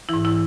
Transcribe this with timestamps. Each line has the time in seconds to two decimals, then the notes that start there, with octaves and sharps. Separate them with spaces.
0.09 G#2 E3 E4
0.25 E4